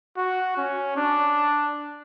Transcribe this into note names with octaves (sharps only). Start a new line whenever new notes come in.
F#4
C#4
D4